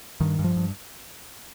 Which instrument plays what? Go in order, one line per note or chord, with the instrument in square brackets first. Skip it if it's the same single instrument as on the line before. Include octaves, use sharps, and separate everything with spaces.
[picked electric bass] G2 D#3
G2
F3
G2